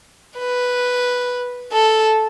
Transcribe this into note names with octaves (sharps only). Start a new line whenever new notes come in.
B4
A4